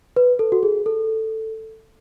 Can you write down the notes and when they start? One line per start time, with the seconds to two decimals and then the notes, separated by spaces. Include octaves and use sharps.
0.16 B4
0.39 A4
0.52 F#4
0.63 G#4
0.86 A4